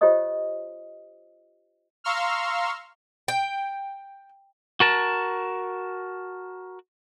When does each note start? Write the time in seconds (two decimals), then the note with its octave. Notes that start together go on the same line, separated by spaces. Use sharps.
0.01 F4 G4 C5 C#5 D#5 D#6
2.04 F5 A#5 C6 C#6 E6 F6
3.28 G5
4.80 F#4 A#4 A5